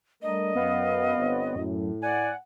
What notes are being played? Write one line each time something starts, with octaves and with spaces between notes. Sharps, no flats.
G3 A3 D4 A#4 D#5
F#2 B3 F5
G1 C4 C#5
F#2 A2
D5 F#5 G#5